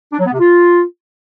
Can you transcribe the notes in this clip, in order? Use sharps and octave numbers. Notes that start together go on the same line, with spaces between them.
D4
F#3
B3
C3
F4